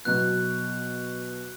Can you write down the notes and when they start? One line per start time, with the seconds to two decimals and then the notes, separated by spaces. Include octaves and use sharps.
0.05 B2 F#3 B3 F#6